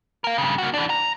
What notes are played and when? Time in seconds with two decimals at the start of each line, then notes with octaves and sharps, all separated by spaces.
0.24 A#4 F5
0.38 G2 C#3
0.58 A#3 F#4
0.74 E3 D4
0.90 A#5